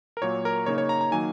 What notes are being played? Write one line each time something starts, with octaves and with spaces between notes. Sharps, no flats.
A#4
A#2 F#3 A#3 C#5
A#4
C#3 A#3 D#4 C#5
C#5
A#5
A#5
D#3 F#3 A#3 D#4 G#5